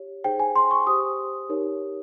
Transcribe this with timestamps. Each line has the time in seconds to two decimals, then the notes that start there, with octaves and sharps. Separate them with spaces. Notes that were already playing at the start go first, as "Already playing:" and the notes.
Already playing: G4 C#5
0.24 D#4 G#4 C5 G5
0.40 G#5
0.56 C6
0.71 C#6
0.87 G4 C5 D#6
1.49 D#4 G4 A#4 C#5